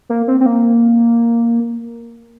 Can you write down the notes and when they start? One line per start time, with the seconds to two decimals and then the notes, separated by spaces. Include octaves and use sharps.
0.10 A#3
0.28 C4
0.41 C4
0.46 A#3